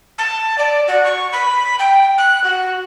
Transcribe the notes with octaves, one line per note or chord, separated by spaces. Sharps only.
A5
D5
F#4
C#6
B5
G5
F#6
F#4